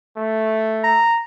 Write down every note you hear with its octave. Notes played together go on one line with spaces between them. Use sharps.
A3
A#5